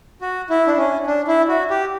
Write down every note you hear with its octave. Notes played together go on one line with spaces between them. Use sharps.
F#4
E4
D4
C#4
D4
E4
F#4
G4